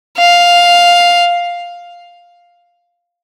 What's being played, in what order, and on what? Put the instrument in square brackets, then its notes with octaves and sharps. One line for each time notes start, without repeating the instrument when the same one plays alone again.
[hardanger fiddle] F5